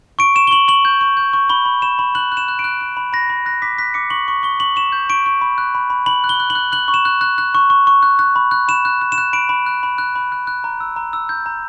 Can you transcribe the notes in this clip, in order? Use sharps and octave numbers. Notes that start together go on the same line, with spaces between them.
C#6 D7
C#6 E7
G7
C#6 F#7
C#6 F#7
G6
C#6
G6
C#6
B5 G7
B5
B5 E7
B5
F#6 F#7
F#6
E7
F#6
D7
F#6
F#6
B5
B5 A#6
B5
F#6 A#6
D6 B6
F#6 B6
D6 C#7
C#6 F#7
C#6
C#6 G7
C#6 F#7
C#6 E7
G6
C#6 D7
C#6
B5
F#6
B5
B5
B5 F#7
F#6
G7
F#6
F#7
F#6
F#6 F#7
C#6
E7
F#6
F#6
F#6
C#6
C#6
C#6
F#6
F#6
B5
F#6
B5 E7
F#6
F#6
E7
F#6
B5 D7
B5
F#6
B5
F#6
B5
F#6
F#6
A#5
E6
A#5
E6
G6
A#5